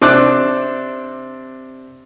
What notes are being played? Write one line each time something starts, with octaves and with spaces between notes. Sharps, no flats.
C3 C4 D4 D6 F#6